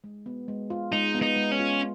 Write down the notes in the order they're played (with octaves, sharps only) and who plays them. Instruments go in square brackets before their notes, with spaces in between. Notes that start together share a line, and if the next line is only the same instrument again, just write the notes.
[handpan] G#3
B3
G#3
F4
[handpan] G#3 [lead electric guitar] D#4
[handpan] B3
[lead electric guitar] D#4
[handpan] G#3
[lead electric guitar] C#4
[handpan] F4